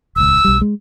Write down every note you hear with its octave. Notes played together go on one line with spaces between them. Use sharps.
D#1 C#2 E6
B1 G3
G#3